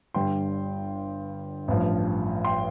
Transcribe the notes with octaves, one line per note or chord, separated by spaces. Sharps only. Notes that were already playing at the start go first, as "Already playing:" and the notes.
G1 G2 G3 D4 G5 C6
A1 G2 F3
G5 C6